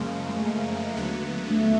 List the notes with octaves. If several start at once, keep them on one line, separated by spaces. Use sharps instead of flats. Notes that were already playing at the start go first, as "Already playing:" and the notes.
Already playing: F#2 C#3 F3 G#3 A#3
G#3
A3
A#3
D#2 D3 F#3 B3
A3
A3